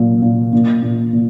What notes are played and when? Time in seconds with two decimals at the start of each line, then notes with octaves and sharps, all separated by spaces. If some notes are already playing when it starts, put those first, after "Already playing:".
Already playing: A#2 F#3
0.22 A#2
0.53 A#2
0.83 A#2
1.13 A#2